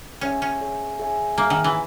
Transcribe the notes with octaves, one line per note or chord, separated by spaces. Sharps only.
C#4 G#4 C#5 E5 G#5
C#4
G#4 C#5 E5 G#5
G#4 C#5 E5 G#5
A#3 G#4 C#5 E5 G#5
D#3
E3